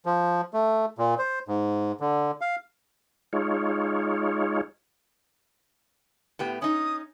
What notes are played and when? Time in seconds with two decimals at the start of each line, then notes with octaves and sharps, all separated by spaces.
0.06 F3
0.53 A3
0.98 A#2
1.19 C5
1.48 G#2
2.00 D3
2.41 F5
3.33 G#3 D#4 F4 C#5
6.39 A2 B3 G4
6.62 C#4 D#4 D#6